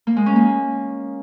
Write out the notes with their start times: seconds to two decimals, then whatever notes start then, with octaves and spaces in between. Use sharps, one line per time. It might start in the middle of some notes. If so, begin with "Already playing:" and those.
0.07 A#3
0.17 G#3
0.26 C#4
0.36 A#3